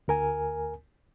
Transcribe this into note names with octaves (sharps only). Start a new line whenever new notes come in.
D2 A#4 G#5